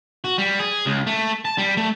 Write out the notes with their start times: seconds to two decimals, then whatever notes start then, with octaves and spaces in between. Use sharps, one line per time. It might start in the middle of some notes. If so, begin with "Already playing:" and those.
0.24 F#4
0.38 G3
0.59 G#4
0.86 C#2
1.07 A3
1.45 A5
1.58 G3
1.77 A3